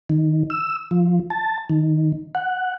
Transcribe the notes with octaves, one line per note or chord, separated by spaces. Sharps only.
D#3
E6
F3
A5
D#3
F#5